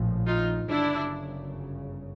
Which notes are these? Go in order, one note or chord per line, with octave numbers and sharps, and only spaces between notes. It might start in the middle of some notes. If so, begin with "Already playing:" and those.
Already playing: A#1 A2 F3
D#4 F4
G1 F#2 C#3 D4 E4